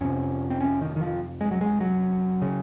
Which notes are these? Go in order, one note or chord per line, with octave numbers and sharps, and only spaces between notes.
F2 C3 C#4
C4
C#4
D#3
D#3
F3
G#3
F#3
G#3
F#3
C#3